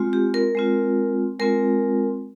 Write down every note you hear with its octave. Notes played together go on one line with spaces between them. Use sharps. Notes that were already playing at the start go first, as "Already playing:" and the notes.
Already playing: G#3 C4 F4
G4
A#4
G#3 C4 F4
G#3 C4 F4 A#4